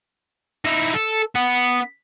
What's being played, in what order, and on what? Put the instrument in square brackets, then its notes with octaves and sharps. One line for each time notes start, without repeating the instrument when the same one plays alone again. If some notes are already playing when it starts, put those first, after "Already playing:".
[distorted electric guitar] D#4 E4
A4
B3